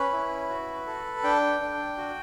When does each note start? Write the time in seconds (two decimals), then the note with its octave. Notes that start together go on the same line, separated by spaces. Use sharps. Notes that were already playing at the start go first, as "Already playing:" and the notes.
Already playing: C#4 B4
0.12 E4
0.49 F#4
0.87 A4
1.23 D4 G5
1.61 D4
1.97 F#4